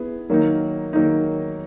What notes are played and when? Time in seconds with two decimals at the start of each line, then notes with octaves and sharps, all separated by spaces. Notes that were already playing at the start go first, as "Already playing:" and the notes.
Already playing: B3 E4 G#4
0.30 D#3 F#3 A#3 D#4
0.93 D#3 F#3 A#3 D#4